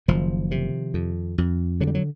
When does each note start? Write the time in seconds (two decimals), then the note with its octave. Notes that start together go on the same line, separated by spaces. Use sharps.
0.08 F#1 D#3 F3
0.51 C3
0.94 F2
1.38 F2
1.81 D3 F#3
1.87 G3
1.95 F#3